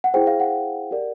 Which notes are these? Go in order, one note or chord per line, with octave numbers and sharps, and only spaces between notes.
F#5
E4 G#4 C5 G5
F5
F#5
G4 A#4 D5